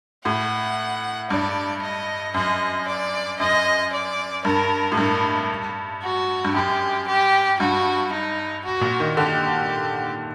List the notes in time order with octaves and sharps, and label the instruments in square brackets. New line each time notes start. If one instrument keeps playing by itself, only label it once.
[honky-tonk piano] A2 [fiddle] F#5
[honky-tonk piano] G2 [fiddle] D5
[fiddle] D#5
[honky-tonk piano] F#2 [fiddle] D#5
[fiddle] D5
[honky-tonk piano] F#2 [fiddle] D#5
[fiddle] D5
[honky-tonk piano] G2 [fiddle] A#4
[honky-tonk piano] A2
[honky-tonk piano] G2 [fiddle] A#4
[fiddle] F#4
[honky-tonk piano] G2
[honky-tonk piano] F#2 [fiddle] G4
[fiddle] G4
[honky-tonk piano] G2 [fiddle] F#4
[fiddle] D#4
F#4
[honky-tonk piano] A#2
D#3
[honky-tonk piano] D3 [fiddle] G4